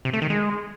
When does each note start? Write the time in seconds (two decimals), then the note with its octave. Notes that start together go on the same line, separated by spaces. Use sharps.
0.05 C3
0.13 A3
0.22 D#3
0.30 G#3